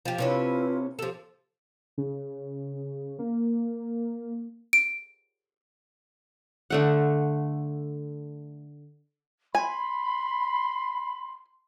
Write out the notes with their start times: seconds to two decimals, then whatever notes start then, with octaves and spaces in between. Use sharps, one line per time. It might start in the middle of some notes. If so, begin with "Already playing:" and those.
0.05 F3 G4
0.18 C3 C#4 D4 E4 F4 B4
0.99 F3 G4 A4
1.98 C#3
3.19 A#3
4.73 D7
6.70 D3 A3 F#5
9.55 G#5 B5 C6